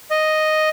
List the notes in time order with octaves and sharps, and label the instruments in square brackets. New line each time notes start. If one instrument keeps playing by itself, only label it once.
[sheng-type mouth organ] D#5